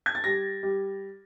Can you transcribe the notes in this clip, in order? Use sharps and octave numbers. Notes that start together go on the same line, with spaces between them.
G#6
A6
G3 A#6
G3